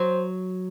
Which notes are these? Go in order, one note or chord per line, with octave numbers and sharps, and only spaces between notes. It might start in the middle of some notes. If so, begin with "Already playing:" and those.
Already playing: F#3 C5